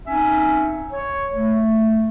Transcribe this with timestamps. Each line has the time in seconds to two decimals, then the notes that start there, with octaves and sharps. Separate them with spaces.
0.07 C4 C#4 D#4 E5 G#5
0.92 C#5
1.35 A3